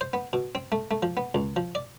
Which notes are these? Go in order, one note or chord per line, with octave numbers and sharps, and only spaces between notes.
C5
B3
B2
C4
A3
A3
F3
B3
C#2
F3
D5